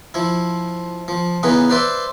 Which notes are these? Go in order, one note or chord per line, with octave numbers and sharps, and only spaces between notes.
F3 E4
F3
C#3 E3 B3 D#4 B4
B4 C5 D5 E5 C6